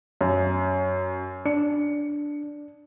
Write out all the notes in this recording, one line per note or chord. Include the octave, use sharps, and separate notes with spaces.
F#2
D4 C#7